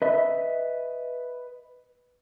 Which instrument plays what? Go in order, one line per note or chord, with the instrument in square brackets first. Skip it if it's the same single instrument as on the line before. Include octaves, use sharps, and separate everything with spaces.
[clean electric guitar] B4 D#5 E5